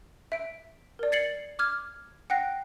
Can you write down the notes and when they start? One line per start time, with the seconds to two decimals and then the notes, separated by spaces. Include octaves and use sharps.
0.32 E5 D7
0.99 A#4 D5
1.12 G#6 A6 C7 C#7 F#7
1.59 D6 F6 G#6
2.30 F#5 G5 F#6 A#6 C7